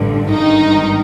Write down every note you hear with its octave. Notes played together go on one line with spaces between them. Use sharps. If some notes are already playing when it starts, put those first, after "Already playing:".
Already playing: A1 G2 D3
G#1 G2 D#3 D#4